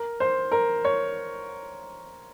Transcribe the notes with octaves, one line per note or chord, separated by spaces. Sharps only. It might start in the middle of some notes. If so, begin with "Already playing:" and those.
Already playing: A#4
C5
A#4
C#5